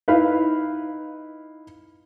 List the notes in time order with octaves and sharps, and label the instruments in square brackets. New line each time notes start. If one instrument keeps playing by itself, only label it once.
[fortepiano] D#4 E4 B4 F5